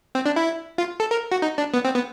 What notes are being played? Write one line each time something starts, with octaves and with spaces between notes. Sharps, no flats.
C4
D4
E4
F4
A4
A#4
F#4
D#4
D4
B3
C4
B3